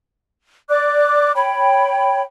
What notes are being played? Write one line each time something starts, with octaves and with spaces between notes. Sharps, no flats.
D5 D6 F#6
C#5 G5 B5